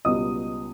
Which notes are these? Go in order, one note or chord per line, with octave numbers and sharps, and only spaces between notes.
C#2 B2 G3 B3 D#5 D#6